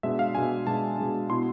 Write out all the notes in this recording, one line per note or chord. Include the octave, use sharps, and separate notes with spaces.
B2 G#3 D4 E5
F5
B2 G#3 D4 G#5
B2 G#3 D4 A5
B2 G#3 D4
B2 B3 E4 C6